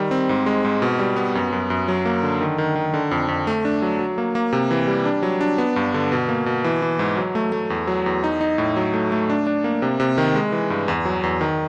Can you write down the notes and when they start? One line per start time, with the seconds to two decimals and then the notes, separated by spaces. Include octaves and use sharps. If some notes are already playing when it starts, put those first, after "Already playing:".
Already playing: D#3 G3
0.11 C4
0.29 G#2
0.46 G#3
0.64 G#2
0.82 B2
0.99 G3
1.16 B3
1.35 F#2
1.53 F#2
1.70 F#2
1.88 F#3
2.05 A#3
2.23 D3
2.41 D#3
2.58 D#3
2.76 D#3
2.94 D3
3.11 F2
3.28 F2
3.47 A3
3.65 D4
3.82 F#3
3.99 F#3
4.18 A#3
4.35 A#3
4.53 C3
4.71 E3
4.88 G3
5.05 D4
5.23 F#3
5.41 D4
5.58 B3
5.76 G2
5.94 D3
6.12 B2
6.28 A#3
6.46 B2
6.64 E3
6.82 E3
6.99 G#2
7.17 F#3
7.35 A3
7.52 A3
7.70 E2
7.87 F#3
8.06 E2
8.24 D#4
8.41 D#4
8.58 A2
8.77 F#3
8.94 A3
9.12 A3
9.30 D4
9.47 D4
9.64 A#3
9.82 C3
10.00 C3
10.18 D#3
10.35 G#3
10.52 E3
10.70 G2
10.88 E2
11.05 F#3
11.23 E2
11.41 D#3